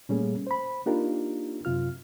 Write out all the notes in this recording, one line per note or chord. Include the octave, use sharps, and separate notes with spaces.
A#2 G3 A3 A#3 C#4 G#4
C5 B5
A#3 D4 D#4 F4 G4 A#4
F#2 C3 F4 F6